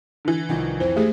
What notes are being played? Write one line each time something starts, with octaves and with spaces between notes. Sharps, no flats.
D3 E3
C2 D#3 F3
F2 C5
G#3 A3 G4 G#4